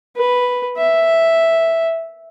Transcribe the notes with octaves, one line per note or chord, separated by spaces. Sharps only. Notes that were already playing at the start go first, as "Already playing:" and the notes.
B4
E5